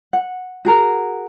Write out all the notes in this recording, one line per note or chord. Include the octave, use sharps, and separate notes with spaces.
F#5
F#4 G#4 A#4